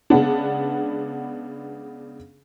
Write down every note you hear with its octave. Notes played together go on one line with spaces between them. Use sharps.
C#3 G#3 B3 D4